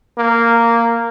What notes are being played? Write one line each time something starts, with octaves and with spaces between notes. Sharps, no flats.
A#3